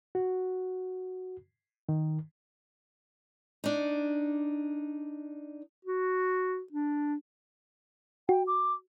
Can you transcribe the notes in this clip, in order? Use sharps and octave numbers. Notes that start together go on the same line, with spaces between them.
F#4
D#3
D4 D#4
F#4
D4
F#4 G5
D6